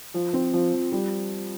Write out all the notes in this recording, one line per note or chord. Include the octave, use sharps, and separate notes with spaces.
F3
C4
F3
F3
G3